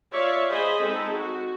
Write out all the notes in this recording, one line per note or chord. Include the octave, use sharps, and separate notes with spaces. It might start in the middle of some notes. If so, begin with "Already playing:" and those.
F4 C#5 D5 E5 F5
G#4 C5 D#5 G#5 B5
G#3 C4 D#4 A4
F#4